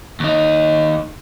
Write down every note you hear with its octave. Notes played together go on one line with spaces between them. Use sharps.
D#2 D#4